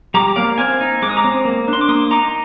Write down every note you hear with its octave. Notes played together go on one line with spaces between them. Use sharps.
G3 A#5 D6
A#3 D5 F5
C4 F5 G#5
D#4
G#3 D6
D#6
A#5 D6
C4
A#3
D4
C6
D6
A#3 C6 D#6
D#4 A#5 D6